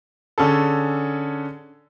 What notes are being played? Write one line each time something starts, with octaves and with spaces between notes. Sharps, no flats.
D3 C#4 G#4 A4